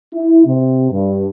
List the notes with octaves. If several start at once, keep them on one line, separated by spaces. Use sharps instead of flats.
E4
C3
G2